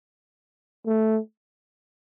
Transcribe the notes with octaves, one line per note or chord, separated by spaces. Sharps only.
A3